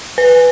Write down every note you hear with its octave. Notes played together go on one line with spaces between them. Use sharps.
B4